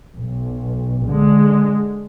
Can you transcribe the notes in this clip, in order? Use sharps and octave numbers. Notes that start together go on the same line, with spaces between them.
B1
D3 G#3